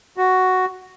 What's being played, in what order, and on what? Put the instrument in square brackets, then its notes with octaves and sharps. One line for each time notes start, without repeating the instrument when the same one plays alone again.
[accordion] F#4